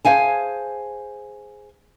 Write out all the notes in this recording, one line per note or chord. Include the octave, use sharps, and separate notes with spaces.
G#4 C5 F5 G#5 A5